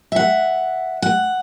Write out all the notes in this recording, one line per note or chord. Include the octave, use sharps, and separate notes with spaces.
E5 F#5
F#5